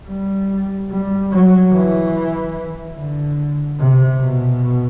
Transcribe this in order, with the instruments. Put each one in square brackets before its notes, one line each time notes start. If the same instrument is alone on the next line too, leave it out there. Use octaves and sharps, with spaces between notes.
[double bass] G3
G3
F#3
E3
D3
C3
B2